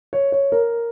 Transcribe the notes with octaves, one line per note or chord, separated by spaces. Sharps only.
C#5
C#5
A#4